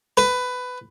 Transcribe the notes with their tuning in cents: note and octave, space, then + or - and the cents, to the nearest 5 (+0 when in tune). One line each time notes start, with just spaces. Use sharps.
B4 +15